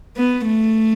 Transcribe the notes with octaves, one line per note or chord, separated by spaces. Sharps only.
B3
A3